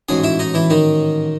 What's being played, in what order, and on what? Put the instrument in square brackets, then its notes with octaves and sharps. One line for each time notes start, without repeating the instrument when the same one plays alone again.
[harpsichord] A1 G#2 F#3 G#4 G#5
E4 E5
D#4 D#5
E3 E4
D#3 D#4